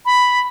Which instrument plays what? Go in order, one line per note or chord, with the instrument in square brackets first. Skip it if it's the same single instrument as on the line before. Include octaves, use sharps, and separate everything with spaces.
[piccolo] B5